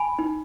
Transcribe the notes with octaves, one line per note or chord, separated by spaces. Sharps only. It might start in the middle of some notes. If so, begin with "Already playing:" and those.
Already playing: G#5 B5
D#4